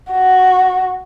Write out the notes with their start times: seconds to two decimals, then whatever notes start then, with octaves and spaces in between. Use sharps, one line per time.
0.12 F#4